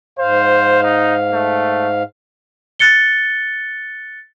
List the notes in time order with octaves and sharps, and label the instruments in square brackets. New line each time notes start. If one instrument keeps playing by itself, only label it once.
[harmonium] G#2 F5 [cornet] C5
[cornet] D#4
A3
[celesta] F#6 A6 C#7 G7